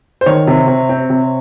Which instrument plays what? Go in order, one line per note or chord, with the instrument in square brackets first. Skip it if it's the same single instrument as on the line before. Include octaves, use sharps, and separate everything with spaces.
[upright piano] C5
D#3 C#5
C3
C3
C4
C3